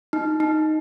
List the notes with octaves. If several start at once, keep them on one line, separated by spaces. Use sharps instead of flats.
D#4
D#4